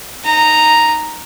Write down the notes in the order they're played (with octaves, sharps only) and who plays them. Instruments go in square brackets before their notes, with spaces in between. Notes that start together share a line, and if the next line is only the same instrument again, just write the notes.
[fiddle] D#4 A#5